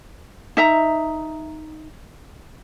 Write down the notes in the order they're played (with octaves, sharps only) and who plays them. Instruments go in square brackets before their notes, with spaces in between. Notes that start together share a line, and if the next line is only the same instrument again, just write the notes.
[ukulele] D#4 E5 A#5